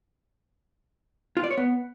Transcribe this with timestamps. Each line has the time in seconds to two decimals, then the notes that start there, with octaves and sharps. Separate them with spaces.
1.37 F4
1.44 D5
1.51 C#5
1.57 B3